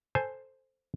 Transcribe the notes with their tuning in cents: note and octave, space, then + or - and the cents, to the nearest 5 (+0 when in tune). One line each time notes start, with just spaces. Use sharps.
A4 +0 C5 +0 G#5 +0